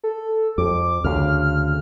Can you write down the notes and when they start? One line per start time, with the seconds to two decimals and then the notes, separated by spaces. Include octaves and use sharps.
0.04 A4
0.58 F2 D6
1.04 D2 C#3 F6